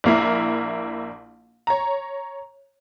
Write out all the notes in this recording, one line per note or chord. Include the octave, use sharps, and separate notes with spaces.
A#1 A#3 E4
C#5 A#5